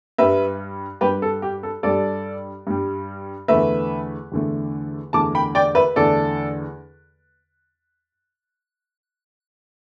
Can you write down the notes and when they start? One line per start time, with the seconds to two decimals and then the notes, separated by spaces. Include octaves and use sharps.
0.18 G2 G3 B4 E5
1.01 G2 G3 G4 B4
1.22 A4
1.42 G4
1.63 A4
1.83 G2 G3 A4 D5
2.67 G2 G3
3.48 E2 D3 A3 B4 E5
4.32 E2 D3 A3
5.13 E2 D3 A3 A5 D6
5.35 G5 B5
5.55 D5 G5
5.75 B4 E5
5.96 E2 D3 A3 A4 D5